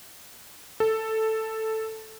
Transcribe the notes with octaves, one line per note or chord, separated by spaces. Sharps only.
A4